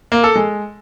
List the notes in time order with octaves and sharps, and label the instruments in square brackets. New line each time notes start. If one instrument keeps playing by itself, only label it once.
[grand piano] A#3
A4
G#3